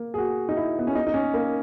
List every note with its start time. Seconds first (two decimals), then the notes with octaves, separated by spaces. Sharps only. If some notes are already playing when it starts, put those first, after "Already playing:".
Already playing: A#3
0.14 G#4
0.18 F#4
0.49 D#4
0.57 E4
0.79 B3
0.87 C#4
0.95 D#4
1.07 D#4
1.14 C#4
1.34 A#3